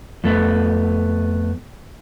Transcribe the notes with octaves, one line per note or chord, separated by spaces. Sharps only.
F2 A3 B3